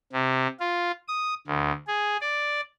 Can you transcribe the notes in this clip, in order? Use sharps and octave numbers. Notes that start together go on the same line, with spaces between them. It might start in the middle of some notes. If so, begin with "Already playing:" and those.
C3
F4
D#6
D2
G#4
D5